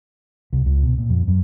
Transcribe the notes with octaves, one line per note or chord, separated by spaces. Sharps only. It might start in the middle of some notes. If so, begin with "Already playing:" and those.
C2
C#2
B2
A#2
F2
F#2